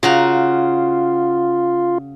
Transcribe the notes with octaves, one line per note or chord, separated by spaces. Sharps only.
C#3 F4 F#4 A#5